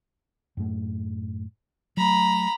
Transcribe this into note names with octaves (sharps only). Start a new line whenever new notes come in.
F#2 A2 A3
F#3 A3 A#5 B5